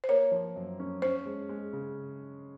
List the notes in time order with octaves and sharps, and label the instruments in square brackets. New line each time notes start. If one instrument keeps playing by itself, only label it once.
[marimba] C5
[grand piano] A#3 [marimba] C#5
[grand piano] F3
F#2
C#4
[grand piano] C#4 [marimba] C5
[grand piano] G#3
G#3
C#3